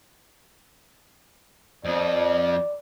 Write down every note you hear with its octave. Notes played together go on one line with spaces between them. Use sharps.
F2 D5